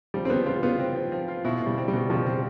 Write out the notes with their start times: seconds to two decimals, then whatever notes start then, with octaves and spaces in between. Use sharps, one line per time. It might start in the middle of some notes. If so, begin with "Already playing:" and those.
0.14 F3 G3
0.25 C4
0.30 F3 B3
0.46 C4 F4
0.63 B3 F4
0.79 C4
0.95 F3
1.12 F3
1.28 F4
1.44 B2 E4
1.60 B2
1.66 G3
1.78 C4
1.88 G3
1.93 B2
2.10 B2 F3
2.26 C4